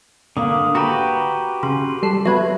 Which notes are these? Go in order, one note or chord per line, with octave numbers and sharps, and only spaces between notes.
D3 A#3 F5 D#6
F#4 G4 B4 A#5 B5
C#3 C6
G3 A4 C7
F#3 B3 B4 E5 G#6